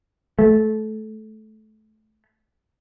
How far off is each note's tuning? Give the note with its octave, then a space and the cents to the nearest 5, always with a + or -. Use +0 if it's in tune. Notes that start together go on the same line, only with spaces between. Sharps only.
A3 -20